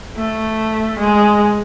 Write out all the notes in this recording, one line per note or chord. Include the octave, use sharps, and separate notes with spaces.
A3
G#3